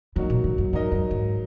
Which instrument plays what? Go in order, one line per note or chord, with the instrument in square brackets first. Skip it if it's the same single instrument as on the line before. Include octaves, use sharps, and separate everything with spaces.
[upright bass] C#3 [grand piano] F#3 A#3 D#4 F#4
[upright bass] A#2
G#2
F#2
[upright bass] G#2 [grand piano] F#3 D#4 A#4 D#5
[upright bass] F#2
G#2